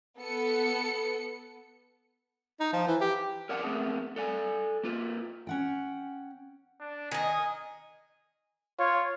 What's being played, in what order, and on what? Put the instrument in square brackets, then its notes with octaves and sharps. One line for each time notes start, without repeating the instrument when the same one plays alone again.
[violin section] B3 A4 C#7
[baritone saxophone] D#4
F3
E3
G4
[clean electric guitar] A#4 C#5 D5 F#5 A5
A3 B3 C4 G#4 A#4
A4 D5 G#5
A#3 F4 B4
[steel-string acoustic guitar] C#4 F#5 G5
[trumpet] D4
[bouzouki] D#3 D#5 [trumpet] G#5
[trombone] F4 [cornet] C#5